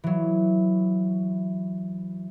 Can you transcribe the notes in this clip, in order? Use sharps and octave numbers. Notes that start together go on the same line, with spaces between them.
E3 F#3